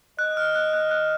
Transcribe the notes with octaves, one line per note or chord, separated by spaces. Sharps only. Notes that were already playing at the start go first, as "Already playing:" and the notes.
D#5 F#6
F6
F#6
F#6
F#6